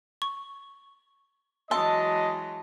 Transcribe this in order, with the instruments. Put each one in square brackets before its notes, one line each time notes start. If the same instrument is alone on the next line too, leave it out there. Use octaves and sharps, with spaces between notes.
[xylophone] C#6
[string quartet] E3 F#3 G#3 [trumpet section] D#5 [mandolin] A5 [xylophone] C6 E6